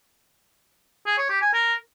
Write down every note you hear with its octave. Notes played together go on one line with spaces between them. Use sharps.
G#4
C#5
G4
G#5
A#4